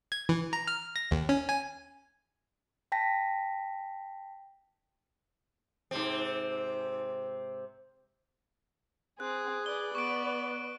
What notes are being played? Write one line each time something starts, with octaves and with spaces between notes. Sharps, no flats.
G#6
E3
A#5
F6
A#6
D#2
C#4
G#5
G5 A5 A#6 B6
G#2 C3 C4
C4 G#4 F#6
B4 D5 G7
B3 C#6 D7